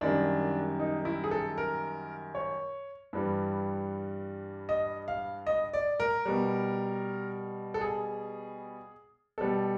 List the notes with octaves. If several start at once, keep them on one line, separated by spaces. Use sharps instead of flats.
F#2 D#3 G3 D4
D#4
E4
G#4
A4
A#4
C#5
G2 E3 G3
D#5
F5
D#5
D5
A#4
B2 G3
A4
G#4
B2 G3 A4